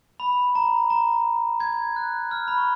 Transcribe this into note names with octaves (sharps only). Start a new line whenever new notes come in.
B5
A#5
A#5
G#6
F#6
F6
B5
C#6